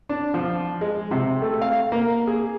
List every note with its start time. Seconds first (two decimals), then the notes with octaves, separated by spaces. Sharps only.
0.09 D4
0.34 F3
0.81 G#3
1.11 C3
1.42 A3
1.61 F5
1.92 A#3
2.27 G#4